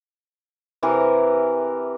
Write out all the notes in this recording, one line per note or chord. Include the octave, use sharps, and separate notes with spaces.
C3 E3 G4 A#4